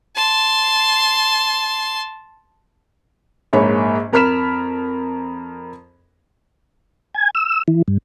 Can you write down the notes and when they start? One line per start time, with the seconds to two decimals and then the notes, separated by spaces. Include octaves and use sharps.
0.16 A5 C6
3.53 A#1 G#2 A#3 C#5 B5
4.12 F2 A#4 B5 F6 B6 E7
7.14 G#5
7.35 E6
7.68 E3
7.88 G2